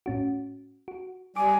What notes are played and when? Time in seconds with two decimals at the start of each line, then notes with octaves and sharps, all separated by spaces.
0.06 A2 C#4 F#4
0.88 F#4
1.36 G3 G#5 D6